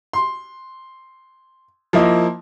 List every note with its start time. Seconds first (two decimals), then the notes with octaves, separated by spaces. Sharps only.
0.13 C6
1.93 F3 A#3 E4 D#5